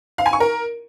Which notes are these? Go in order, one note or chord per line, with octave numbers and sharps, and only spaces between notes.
F5
G#5
C#6
A#4